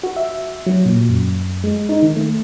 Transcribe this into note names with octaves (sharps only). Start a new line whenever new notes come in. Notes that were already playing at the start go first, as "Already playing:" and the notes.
F#4
E5
F#3
A#2
F#2
G#3
D#4
D#3
A3